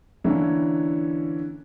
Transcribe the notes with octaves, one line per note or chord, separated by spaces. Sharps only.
D3 E3 A#3 C#4 D4 E4